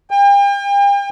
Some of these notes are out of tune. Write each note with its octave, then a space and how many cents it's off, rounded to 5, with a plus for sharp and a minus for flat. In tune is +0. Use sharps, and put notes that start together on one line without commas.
G5 +40